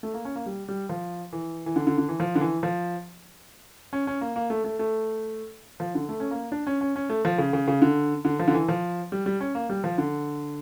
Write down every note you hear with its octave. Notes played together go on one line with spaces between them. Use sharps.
A3
A#3
C#4
A#3
G3
G3
F3
E3
E3
D3
D3
D3
E3
F3
D3
E3
F3
C#4
C#4
A#3
A#3
A3
A3
A3
F3
D3
A3
C#4
A#3
D4
C#4
C#4
C#4
A3
F3
C#3
C#3
C#3
D3
D3
F3
D3
E3
F3
G3
G3
C#4
A#3
G3
F3
D3